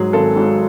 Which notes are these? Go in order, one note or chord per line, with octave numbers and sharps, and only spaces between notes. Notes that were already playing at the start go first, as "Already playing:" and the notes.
Already playing: G#2 F#3 G#4
G#1 A4
G#2 F#3